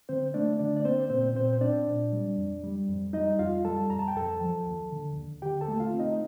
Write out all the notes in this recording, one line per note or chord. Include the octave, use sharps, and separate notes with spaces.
D3 C4 C5
A3 D4 D5
D3 D4 D5
D5
A#3 C4 C5
A#2 C4 C5
A#2 C4 C5
C5
C4 D4 D5
A#2
G3
F2
G3
F2
G3 D#4 D#5
F2 F4 F5
G3 A4 A5
F2 A#5
A5
G5
F2 A4 A5
F3
D#2
D3
D#2
D3 G4 G5
A4 A5
A3
F4 F5
C4
D#4 D#5